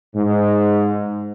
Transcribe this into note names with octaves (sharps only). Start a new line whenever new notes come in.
G#2